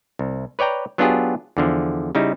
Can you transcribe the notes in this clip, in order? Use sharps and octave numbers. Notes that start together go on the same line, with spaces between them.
C2
B4 C#5 D5 G5 A#5
F#3 B3 D4 F4 G4 G#4
E2 D3 F3
C#3 G3 D#4 E4